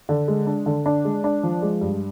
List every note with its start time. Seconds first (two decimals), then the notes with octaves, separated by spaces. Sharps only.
0.09 D3
0.28 G#3
0.47 D4
0.66 D3
0.86 D4
1.05 G#3
1.24 D4
1.43 F3
1.62 G#3
1.81 G2